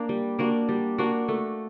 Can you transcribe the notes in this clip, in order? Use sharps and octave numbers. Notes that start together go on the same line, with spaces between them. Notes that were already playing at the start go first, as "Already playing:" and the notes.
Already playing: A#3 D4
G3
A#3 D4 F#4
G3
A#3 D4 F#4
A3